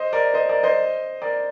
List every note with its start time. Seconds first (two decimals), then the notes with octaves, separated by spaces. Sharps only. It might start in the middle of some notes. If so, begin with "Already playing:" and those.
Already playing: C5 D#5
0.13 A#4 D5
0.34 C5 D#5
0.49 A#4 D5
0.63 C5 D#5
1.22 A#4 D5